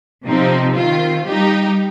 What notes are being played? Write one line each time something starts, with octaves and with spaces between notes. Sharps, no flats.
C3 F3 C4 D#4
D#3 C4 F4
G3 D#4 G4